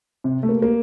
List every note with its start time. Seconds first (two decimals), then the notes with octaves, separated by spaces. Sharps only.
0.24 C3
0.43 A3
0.49 A#3
0.62 A#3